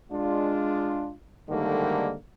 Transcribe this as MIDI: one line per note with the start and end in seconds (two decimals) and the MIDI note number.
0.11 1.13 56
0.11 1.13 62
0.11 1.13 65
1.49 2.14 44
1.49 2.14 50
1.49 2.14 51
1.49 2.14 55
1.49 2.14 57
1.49 2.14 58